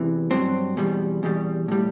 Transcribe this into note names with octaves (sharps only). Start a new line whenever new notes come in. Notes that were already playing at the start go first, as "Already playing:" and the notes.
Already playing: E2 C3 E3
G2 F#3 C4
E2 B2 G3
E2 B2 G3
A2 G3